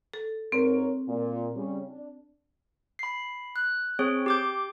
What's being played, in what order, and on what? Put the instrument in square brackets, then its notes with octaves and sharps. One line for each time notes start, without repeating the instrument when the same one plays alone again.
[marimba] A4
[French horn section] G#2 A#4 C#5 [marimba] C4
[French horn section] A#2
C#3 G3 C#4
D4
[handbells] B5 C7
F#6
C4 G#4 C#5
G4 D6 G6